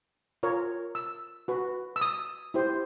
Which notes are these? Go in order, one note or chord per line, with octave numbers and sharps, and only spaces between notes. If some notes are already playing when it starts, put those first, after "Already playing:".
F4 A#4 C#5
E6
F#4 B4
E6
D#6
E4 G4 C5